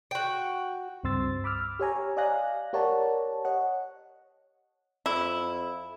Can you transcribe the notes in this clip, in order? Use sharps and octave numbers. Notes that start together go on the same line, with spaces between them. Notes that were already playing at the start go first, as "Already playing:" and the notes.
F#4 G5
C#2 G2 C4 C6 E6 A6
B5 D6 E6 F6
G4 C#5 G#5 A#5
D5 D#5 F5 G#5 F#6 A#6
G4 A#4 C#5 D5 F#5 A5
C#5 D#5 F#5
F2 E4